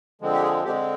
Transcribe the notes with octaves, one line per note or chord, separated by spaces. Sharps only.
D3 F3 G#3 C4
G4
G#4
D3 G#3 C4 G4